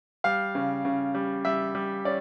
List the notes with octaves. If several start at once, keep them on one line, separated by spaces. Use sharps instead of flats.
G3 F5
C#3
C#3
G3
G3 E5
G3
C#4 D5